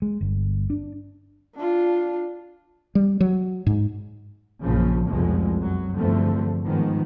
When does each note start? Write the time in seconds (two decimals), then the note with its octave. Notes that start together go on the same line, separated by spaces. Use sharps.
0.02 G#3
0.21 G1
0.70 D4
1.55 D4 F4
2.95 G3
3.21 F#3
3.66 G#2
4.63 A#1 F#2 C#3 F3
5.06 F1 C2 F2 B2 F3 G#3
5.57 F#2 F#3
5.96 E2 G2 D3 F3 A3 C4
6.64 G#2 D#3 F3 G#3 B3